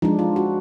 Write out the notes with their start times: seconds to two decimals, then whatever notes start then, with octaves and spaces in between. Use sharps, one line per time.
0.02 F3 G#3 D4 D#4
0.19 F4
0.36 F#4